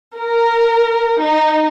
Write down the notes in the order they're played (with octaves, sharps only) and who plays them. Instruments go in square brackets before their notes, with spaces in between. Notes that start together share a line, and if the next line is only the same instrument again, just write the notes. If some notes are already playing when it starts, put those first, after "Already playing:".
[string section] A#4
D#4